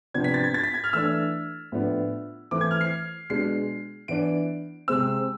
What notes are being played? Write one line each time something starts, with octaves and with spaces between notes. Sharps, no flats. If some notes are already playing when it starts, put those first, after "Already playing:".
C3 F3 B3 D4 G#6
B6
A6
G#6
A6
B6
G#6
F6
E3 A3 D4 E6
A2 F3 B3 D4
E3 A3 C4 D6
G#6
F6
C7
B2 G#3 D4 C7
E3 B3 D4 D7
C3 G#3 C4 E6